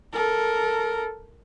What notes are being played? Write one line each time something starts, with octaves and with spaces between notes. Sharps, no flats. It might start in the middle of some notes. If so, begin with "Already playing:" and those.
A4 A#4